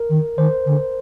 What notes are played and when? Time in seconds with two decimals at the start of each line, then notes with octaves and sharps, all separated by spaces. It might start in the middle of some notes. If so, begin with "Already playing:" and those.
Already playing: A#4
0.10 D#3
0.37 D#3 C5
0.66 D3